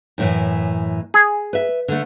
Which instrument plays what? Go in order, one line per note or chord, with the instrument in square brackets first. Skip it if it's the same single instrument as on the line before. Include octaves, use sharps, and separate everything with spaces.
[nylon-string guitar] F#2 A2 E3
[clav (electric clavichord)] G#4
[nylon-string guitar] B4 E5
D3 A3